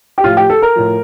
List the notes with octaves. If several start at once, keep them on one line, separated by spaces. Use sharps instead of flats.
G4
A2 F3 F4
G4
A4
A#4
A2 F3